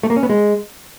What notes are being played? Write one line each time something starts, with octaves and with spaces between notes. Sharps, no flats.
A3
A#3
C#4
B3
G#3